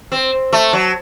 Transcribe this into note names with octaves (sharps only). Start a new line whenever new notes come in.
C4
A3
F#3